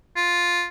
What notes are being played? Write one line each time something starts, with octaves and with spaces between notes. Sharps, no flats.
F4